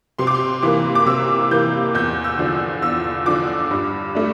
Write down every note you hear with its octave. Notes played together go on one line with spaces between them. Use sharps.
C3 C6
D6
C6
E3 A#3 D6
D6
C3 E6
E3 A#3 G6
E2 G6
E6
D3 F3
E2 E6
D3 F3 D6
G2
A3 D4